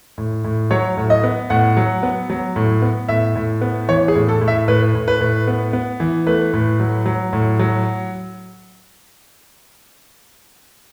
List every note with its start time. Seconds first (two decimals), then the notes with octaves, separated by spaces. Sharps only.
0.18 A2
0.44 A2
0.71 F#3 C#5
0.97 A2
1.10 D#5
1.24 B3
1.50 A2 F#5
1.77 F#3
2.03 B3
2.30 F#3
2.56 A2
2.82 B3
3.09 A2 E5
3.35 A2
3.61 B3
3.89 E3 C#5
4.08 G#4
4.15 A2
4.29 A4
4.41 A2
4.48 E5
4.68 A2 B4
4.95 A2
5.08 B4
5.20 A2
5.48 B3
5.73 B3
6.00 E3
6.27 A3 B4
6.53 A2
6.80 F#3
7.06 F#3
7.33 A2
7.59 F#3